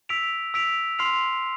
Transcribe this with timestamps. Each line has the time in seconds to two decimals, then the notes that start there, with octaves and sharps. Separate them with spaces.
0.09 E6 B6 D7 F7
0.54 E6 B6 D7 F7
0.99 C6 F6 C7 F7